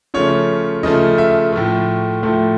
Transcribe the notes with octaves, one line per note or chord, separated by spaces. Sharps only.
C#3 F3 A3 C#5
C#3 F3 A3 D#5
E5
A2 F3 A3
A2 F3 A3